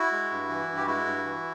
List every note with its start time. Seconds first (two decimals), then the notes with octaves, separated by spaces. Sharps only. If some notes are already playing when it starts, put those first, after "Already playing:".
Already playing: E4 F#4
0.12 G#3
0.31 G2
0.49 E3
0.68 G2
0.77 G4
0.87 G#3 E4 F#4
1.05 G2
1.25 E3